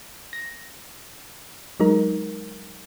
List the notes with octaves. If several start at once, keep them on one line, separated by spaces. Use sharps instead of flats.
A#6
F#3 G#3 D#4 A#4